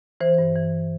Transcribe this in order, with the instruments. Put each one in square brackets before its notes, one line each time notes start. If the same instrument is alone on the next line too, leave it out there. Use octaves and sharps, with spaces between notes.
[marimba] E3 C5
G2
E3